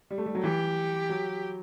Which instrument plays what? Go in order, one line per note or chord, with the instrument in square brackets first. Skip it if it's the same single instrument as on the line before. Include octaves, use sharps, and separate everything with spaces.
[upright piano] G3
A3
G3
F#3
[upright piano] E3 [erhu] G4
[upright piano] F#3